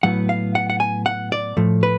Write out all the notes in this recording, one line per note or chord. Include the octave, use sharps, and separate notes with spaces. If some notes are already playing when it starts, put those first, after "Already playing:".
A2 F#3 B3 F#5
F5
F#5
F#5
G#5
F#5
D5
A2 F3 A3
B4